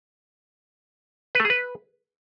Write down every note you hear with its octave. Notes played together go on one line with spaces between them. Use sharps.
B4
A3
G#4
B4